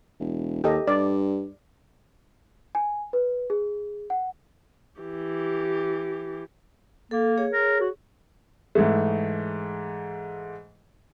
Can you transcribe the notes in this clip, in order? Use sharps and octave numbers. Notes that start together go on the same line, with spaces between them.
E1
D#2 G4 A4 D#5
G2 D5
G#5
B4
G#4
F#5
E3 G4
A#3 A4
G#4 C#5
A#4
F#4
G#2 E3 A3